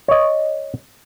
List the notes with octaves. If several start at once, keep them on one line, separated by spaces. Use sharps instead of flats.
C#5 D#5